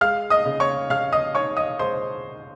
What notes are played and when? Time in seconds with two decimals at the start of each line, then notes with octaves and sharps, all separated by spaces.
0.01 G#3 F5 F6
0.30 D#5 D#6
0.45 C#3
0.60 C#5 C#6
0.90 C#3 F5 F6
1.13 D#5 D#6
1.35 D#4 C#5 C#6
1.57 D#5 D#6
1.79 G#3 C5 C6